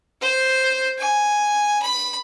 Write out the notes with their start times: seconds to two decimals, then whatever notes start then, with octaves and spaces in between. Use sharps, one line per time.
0.22 C5
0.98 G#5
1.82 B5